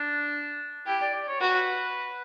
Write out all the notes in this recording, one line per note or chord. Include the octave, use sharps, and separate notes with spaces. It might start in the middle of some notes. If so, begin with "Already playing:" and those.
Already playing: D4
E4 G4
D5
D5
C#5
F#4 B4